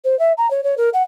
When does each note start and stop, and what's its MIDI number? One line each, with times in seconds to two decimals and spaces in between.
0.04 0.18 72
0.19 0.33 76
0.38 0.49 82
0.51 0.64 73
0.64 0.75 73
0.78 0.90 70
0.94 1.03 78